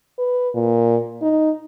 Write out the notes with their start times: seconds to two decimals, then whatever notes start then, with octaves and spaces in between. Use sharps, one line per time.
0.18 B4
0.54 A#2
1.22 D#4